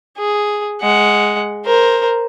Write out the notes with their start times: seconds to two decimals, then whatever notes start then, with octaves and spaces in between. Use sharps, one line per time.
0.18 G#4
0.81 G#3 F#5
1.66 A#4 C5